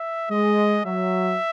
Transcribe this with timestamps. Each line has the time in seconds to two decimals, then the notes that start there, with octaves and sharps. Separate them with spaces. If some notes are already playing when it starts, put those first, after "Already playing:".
Already playing: E5
0.30 G#3 D#5
0.85 F#3 E5